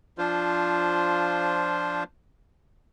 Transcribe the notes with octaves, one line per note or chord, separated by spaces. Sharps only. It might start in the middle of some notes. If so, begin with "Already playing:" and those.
F3 D4 F4 C5